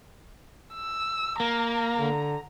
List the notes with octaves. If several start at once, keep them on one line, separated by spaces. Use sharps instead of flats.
E6
A#3 A#5
D3